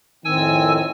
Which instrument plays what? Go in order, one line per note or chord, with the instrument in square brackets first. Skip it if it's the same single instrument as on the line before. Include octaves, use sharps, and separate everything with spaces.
[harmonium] F2 A2 C4 [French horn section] D#3 [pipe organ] G#5 E6